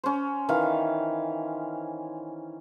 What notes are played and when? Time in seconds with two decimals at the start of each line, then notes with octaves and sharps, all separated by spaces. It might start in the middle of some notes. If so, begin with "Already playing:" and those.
0.04 C#4 C5
0.49 D#3 E3 F5